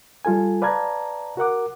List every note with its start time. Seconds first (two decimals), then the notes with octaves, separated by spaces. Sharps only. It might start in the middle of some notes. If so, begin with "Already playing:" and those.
0.25 G3 F4 A4 G#5
0.62 B4 D5 F5 A5 A#5 G#6
1.37 F#4 A#4 F#5 D6